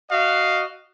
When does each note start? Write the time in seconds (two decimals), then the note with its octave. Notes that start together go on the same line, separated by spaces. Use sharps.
0.11 F#4 D#5 F5